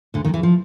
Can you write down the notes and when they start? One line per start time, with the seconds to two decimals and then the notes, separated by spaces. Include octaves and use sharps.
0.14 D2 D3
0.25 D#2 D#3
0.33 E2 E3
0.43 F3